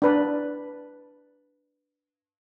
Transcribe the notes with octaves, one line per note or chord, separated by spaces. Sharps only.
D4 B4